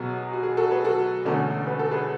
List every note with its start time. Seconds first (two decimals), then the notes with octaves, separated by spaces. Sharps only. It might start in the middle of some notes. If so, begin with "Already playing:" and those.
Already playing: B1 B2 F#3 B3 F#4 G#4
0.33 F#4
0.43 G#4
0.57 F#4 A4
0.71 G#4 B4
0.84 F#4 A4
1.25 E1 E2 D3 A3 C#4
1.67 B4
1.79 A4
1.91 G#4 B4